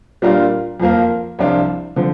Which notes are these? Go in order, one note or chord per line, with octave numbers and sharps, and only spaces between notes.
A#2 G3 D4 F4 A#4
F2 F3 A#3 F4 A#4
C2 C3 F3 D4 F4
D3 F3 C4